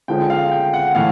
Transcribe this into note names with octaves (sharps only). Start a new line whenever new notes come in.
D3 F3 G#3 C#4 G5
F5
G5
F#5
A2 E3 A3 F5